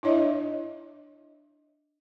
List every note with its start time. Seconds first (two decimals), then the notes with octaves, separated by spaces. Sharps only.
0.03 D4 E4 C#5 D#5 E5